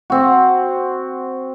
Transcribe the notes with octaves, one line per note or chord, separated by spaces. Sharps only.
C4 F#4